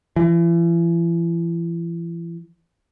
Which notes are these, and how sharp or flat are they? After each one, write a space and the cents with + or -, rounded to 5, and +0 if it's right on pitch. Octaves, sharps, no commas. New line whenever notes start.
E3 +40